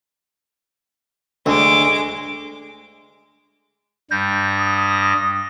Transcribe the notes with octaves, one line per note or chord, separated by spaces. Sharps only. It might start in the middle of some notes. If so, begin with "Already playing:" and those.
D2 G#3 D6
G2 G3 G6 A#6
D#6